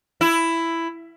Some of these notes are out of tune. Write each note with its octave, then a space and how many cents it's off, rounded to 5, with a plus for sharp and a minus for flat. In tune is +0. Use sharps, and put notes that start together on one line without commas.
E4 +10